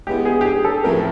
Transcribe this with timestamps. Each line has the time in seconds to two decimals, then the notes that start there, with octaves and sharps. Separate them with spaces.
0.07 G#3 B3 E4 G4
0.25 G#4
0.41 G4
0.45 G#4
0.65 A4
0.84 A2 F3 A3 C4 A#4